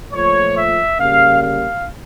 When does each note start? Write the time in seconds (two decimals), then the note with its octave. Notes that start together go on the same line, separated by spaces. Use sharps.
0.13 A#2 F3 A3 C#5
0.56 E5
0.99 C#3 G3 A#3 F5
1.42 F5